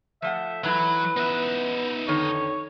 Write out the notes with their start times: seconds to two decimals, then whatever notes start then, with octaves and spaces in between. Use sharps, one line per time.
0.22 F3 A3 E5 F#5
0.64 E3 F#3 E4 B4
1.17 B3 D#4 E5
2.08 F2 D3 D#3 C#5